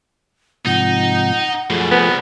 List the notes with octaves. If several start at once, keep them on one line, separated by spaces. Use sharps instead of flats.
G#2 C3 F3 D#4 F#5
F#2 B2 F3 A3 G#4
C2 B3